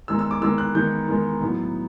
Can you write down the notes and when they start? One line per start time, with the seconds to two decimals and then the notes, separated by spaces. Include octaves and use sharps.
0.08 D#3 G#3 B3 D#4 E6
0.19 E6
0.31 D6
0.42 D#3 G#3 B3 D#4 E6
0.58 F#6
0.74 D#3 G#3 B3 D#4 G6
1.08 D#3 G#3 B3 D#4
1.41 A2 F#3 B3 D#4